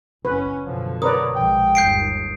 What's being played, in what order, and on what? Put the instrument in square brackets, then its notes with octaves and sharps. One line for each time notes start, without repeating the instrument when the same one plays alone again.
[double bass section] F#1 C#4 [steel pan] B4
[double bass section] F#2 B2 D3 [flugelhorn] F3
[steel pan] A#4 B4 D5 [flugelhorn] C#5 [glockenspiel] D#6
[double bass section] A#1 G#3 [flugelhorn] G5
[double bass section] G1 D#2 [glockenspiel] G6 C7 D7